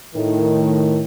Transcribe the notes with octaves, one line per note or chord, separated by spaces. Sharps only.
A2 D#3